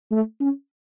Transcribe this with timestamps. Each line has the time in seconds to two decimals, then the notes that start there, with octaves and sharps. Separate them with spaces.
0.12 A3
0.41 C#4